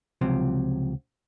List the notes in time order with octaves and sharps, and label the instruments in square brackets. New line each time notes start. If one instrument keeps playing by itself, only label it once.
[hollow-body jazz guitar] C#2 C3 F3 F#3 C4